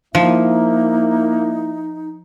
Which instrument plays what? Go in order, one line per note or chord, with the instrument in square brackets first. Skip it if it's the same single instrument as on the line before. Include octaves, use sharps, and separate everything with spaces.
[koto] F3 [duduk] A#3 [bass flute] D#4 [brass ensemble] E4 E5